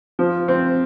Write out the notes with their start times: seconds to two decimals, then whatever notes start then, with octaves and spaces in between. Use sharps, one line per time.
0.19 F3
0.48 C4